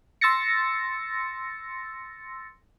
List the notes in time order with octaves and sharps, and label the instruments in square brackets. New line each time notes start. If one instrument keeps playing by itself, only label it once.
[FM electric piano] C6 E6 A6 A#6 C#7